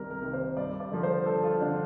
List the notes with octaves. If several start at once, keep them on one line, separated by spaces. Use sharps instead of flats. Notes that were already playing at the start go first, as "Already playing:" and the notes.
Already playing: C2 C3 D#3 G3 A#4
A#4
C3 D#3 G3
C5
G2 D5
D5
D3 F3 A#4
C5
G2 A4
F4
D3 F3 D4